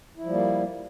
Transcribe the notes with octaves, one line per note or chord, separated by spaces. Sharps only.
F3 G3 A#3 E4